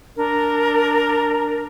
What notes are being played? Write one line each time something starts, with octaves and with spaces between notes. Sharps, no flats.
D4 A#4